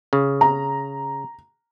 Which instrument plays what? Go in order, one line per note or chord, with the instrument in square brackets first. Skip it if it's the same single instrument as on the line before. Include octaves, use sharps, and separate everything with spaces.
[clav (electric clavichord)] C#3
[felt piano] A#5